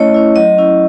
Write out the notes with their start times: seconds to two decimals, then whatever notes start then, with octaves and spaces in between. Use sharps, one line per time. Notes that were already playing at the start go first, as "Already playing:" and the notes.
Already playing: A3 C#4 E4 C#5 D#5
0.14 C#4 E4
0.36 F#3 D#5
0.58 C#4 E4